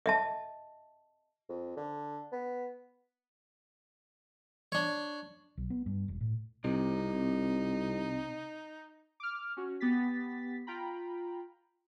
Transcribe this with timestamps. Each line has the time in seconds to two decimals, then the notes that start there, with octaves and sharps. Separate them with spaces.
0.06 D#5 E5 A5
1.49 F2
1.77 D3
2.32 B3
4.72 D4 C#5
5.57 B1
5.70 B3
5.86 G2
6.08 E1
6.21 A2
6.64 C2 C3 D#4
9.20 D6 F6
9.57 C#4 F#4
9.80 B3 G4 A6 B6
10.67 F4 G5 A#5 B5